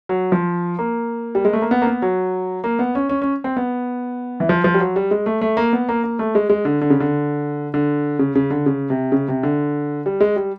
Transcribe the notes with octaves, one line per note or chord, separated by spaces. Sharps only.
F#3
F3
A#3
G3
G#3
A3
A#3
B3
A#3
B3
F#3
A#3
B3
C#4
C#4
C#4
C4
B3
E3
F3
F3
G3
F#3
G3
G#3
A3
A3
A#3
B3
A#3
A#3
A3
G#3
G#3
D3
D3
C#3
D3
D3
C#3
C#3
D3
C#3
C3
C#3
C3
D3
G3
G#3
G3